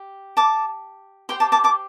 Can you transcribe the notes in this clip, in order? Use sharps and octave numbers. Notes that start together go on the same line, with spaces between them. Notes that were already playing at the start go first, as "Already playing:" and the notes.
Already playing: G4
A5 D6
G4 C5 G5 C6
A5 D6
A5 D6
A5 D6